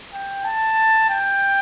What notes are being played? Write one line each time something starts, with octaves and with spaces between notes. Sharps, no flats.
G5
A5
G5